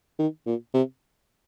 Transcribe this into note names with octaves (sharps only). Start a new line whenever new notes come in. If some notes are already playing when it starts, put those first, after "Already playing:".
D#3
A#2
C3